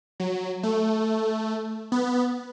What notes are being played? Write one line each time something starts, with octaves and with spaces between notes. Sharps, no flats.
F#3
A3
B3